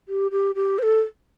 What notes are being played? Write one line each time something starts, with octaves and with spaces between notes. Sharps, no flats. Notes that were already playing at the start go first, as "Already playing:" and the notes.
G4
G4
G4
C5
A4